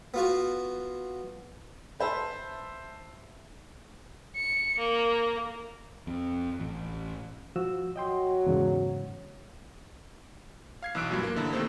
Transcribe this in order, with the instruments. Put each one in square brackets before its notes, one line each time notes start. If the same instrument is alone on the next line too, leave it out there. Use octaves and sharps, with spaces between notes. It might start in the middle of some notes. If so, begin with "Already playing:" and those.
[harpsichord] B3 F4 F#4
[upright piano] B4 C5 E5 A5
[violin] C#7
A#3
[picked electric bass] F2
A1
[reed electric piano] F3 F#4 E6
[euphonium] F#3 [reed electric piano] D#5 G5 C6
[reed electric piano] E2 G#2 C#3
[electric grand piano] F5 G#6 C7
B1 E3 E6 F#6 D7
G2 A#2 F#3
A#3 A#4
A1 D3 E4 A5 A#5
C3 D#3 A3 A#3 A4 C5